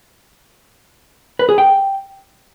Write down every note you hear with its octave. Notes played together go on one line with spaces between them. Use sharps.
B4
G#4
G5